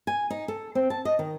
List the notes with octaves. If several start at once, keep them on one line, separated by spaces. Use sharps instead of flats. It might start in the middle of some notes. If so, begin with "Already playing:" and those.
G#5
D#4
A4
C4
A5
D#5
D#3